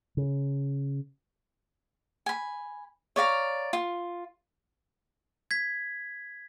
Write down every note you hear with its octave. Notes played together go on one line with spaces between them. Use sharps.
C#3
G#5 B5
C#5 D5 F5 A#5
F4
G#6 B6